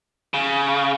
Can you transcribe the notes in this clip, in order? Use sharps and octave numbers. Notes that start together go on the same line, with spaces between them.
C#3